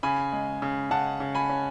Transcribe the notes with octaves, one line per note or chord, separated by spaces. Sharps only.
C#3 G#5 B5
G#3
C#3
C#3 F#5 A5
C#3
G#5 B5
C#4